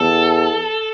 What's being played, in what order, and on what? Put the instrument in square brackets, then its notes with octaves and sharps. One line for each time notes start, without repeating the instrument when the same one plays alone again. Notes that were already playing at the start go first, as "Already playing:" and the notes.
Already playing: [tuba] E2 [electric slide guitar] A4